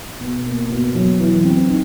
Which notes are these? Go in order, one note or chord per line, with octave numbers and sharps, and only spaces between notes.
B2
A#3
B2
F#3
E3
C4
D#4